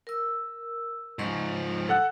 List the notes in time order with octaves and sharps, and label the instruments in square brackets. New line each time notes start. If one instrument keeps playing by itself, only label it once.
[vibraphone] A#4 E6
[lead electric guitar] G#2 F3 [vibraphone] A#5 C6 C#6
[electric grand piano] A4 F#5 F#6